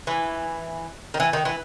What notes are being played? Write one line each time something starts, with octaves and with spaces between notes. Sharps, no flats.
E3
D#3
E3
D#3
E3